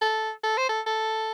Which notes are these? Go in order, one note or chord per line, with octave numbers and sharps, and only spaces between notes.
A4
A4
C5
A4
A4